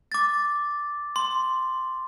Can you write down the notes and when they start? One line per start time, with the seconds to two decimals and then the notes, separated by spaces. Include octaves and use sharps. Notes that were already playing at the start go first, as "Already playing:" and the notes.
0.12 D6 A6
1.16 C6